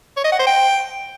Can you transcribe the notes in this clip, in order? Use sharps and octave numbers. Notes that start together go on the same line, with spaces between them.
C#5
D#5
F#5
C5
G5